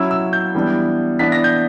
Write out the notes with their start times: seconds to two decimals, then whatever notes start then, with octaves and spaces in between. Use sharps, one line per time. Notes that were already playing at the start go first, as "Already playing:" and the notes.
Already playing: F#3 C#4 E4 E6
0.11 E6
0.33 G6
0.55 E3 G3 B3 D4
1.19 E3 B3 D4 B6
1.32 A#6
1.44 G6